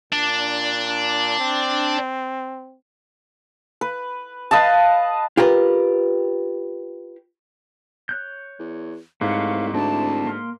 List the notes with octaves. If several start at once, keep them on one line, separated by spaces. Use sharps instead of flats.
A#2 D4
C4
B4
B4 D#5 F5 A5
F4 G4 A#4 B4
C#5 F#6 G6
E2
C2 G#2 A3 B4 C#5 F5
D2 C4 E4 A5
A#3 C6 F6